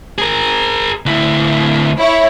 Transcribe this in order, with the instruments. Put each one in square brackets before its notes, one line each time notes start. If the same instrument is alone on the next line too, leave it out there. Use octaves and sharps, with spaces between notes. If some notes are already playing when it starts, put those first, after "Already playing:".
[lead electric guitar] G#4 A#4
D2 E4
[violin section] E4 C#5